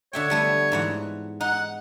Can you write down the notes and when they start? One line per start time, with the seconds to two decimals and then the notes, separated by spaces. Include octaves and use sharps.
0.13 D3 C#5 E5 G5
0.30 G3 A3 B3
0.72 G#2 E3 F#5
1.41 D#4 F#5